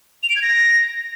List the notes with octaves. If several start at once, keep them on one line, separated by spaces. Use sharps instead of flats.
F7
D7
G#6
A#6